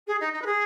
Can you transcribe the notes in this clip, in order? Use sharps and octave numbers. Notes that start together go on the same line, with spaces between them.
G#4
D#4
D#4
B4
G#4